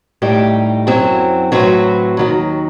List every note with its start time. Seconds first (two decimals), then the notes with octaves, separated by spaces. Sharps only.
0.22 A2 G3 D#4 G4
0.87 F#2 F#3 C4 E4
1.52 A2 F#3 C4 F#4 B4
2.17 D#2 D#3 F#3